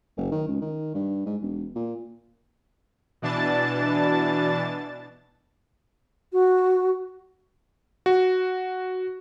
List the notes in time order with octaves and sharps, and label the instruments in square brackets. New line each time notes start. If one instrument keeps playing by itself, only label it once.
[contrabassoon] F#1
D#3
C#2
D#3
G2
G#2
E1
A#2
[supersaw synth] B2 E3 D4 A5 A6
[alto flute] F#4
[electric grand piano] F#4